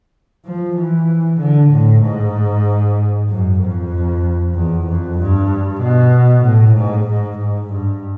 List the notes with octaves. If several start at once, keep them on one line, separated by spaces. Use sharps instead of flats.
F3
E3
D3
A2
G#2
F#2
F2
E2
F2
G2
B2
A2
G#2
G#2
G#2
G2